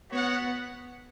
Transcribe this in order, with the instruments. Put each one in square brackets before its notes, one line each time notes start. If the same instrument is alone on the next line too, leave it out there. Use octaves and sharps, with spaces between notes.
[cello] B3 [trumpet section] F#4 C#5 F#5